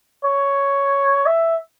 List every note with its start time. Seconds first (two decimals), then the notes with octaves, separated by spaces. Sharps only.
0.25 C#5
1.26 E5